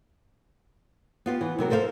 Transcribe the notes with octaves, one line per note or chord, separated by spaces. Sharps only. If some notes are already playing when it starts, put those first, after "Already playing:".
B3 F4 G4
E3
C3 F#3 A#4
A4 A#4 C5 D#5 F5